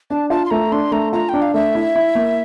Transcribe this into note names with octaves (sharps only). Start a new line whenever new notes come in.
D4 A5
F4 A5
C6
A3 A#5
D4 C6
A3 A#5
F4 A#5
D4 G5
F5
A3 E5
E4
E4
A#3